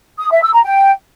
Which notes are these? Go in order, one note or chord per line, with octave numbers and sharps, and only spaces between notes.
D#6
E5
E6
A#5
G5